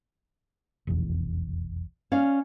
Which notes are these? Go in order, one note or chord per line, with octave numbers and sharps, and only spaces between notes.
F1 B1 E2
C#4 D5 F5